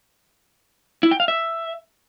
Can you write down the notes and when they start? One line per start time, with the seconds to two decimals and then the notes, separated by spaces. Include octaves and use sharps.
1.03 E4
1.11 G5
1.20 F5
1.28 E5